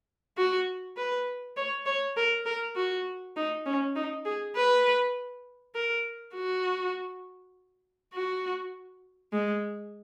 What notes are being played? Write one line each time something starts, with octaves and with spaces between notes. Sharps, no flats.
F#4
B4
C#5
C#5
A#4
A#4
F#4
D#4
C#4
D#4
G#4
B4
A#4
F#4
F#4
G#3